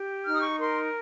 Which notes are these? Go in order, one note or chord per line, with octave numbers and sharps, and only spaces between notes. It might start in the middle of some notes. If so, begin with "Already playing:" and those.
Already playing: G4
D#4 F6
D#6
C#6
A#4 C6